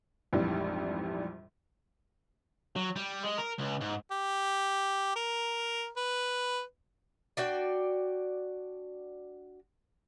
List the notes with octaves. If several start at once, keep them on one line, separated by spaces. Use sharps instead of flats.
A#1 F2 G#2 E3 G3
F#3
G3
G#3
A#4
C#2
G#2
G4
A#4
B4
D4 F#4 D5 G5